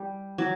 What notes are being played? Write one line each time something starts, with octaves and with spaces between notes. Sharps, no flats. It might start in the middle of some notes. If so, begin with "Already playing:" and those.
Already playing: G3
F#3